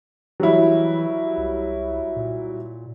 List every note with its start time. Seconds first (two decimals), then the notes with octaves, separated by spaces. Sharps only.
0.40 E3 F#3 G3 E4
1.38 C2
2.16 A#2